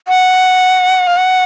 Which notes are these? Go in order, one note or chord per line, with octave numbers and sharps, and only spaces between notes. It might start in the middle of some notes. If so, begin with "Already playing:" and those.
F#5
F5
F#5